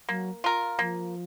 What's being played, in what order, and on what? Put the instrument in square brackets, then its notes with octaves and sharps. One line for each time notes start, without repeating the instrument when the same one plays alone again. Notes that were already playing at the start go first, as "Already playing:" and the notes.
[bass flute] F#3 [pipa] A#3
[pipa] F4 A#4
[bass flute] F3 [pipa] A#3